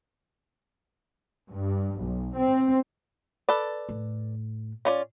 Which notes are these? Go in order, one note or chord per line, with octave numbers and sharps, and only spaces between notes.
G2
B1
C4
A4 B4 D5
A2
C#4 F4 D5